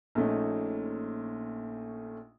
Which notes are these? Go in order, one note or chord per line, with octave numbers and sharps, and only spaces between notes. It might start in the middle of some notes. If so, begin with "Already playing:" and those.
A#1 A#2 A3 C#4 D#4